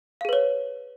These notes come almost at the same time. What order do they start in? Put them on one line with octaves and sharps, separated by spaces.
F5 G#4 B4 C#5